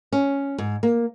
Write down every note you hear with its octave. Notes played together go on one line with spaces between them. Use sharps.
C#4
G#2
A#3